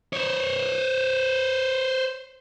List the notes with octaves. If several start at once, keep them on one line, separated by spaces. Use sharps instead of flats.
C5 C#5